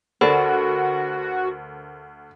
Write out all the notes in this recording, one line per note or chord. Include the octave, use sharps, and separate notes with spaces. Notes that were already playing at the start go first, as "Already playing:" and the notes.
D2 F#4 A4 A#4 C5 D5 B5